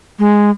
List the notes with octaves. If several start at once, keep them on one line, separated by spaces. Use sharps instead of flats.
G#3